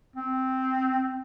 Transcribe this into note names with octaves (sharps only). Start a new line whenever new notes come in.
C4